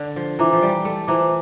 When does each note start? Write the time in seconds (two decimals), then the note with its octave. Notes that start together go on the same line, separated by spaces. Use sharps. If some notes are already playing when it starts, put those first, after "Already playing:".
Already playing: D3
0.16 F3
0.39 E3 F4 C5 E5 A#5 D6
0.53 F3
0.62 G3
0.85 A3
1.08 E3 F4 C5 E5 A#5 D6